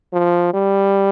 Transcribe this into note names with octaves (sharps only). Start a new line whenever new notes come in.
F3
G3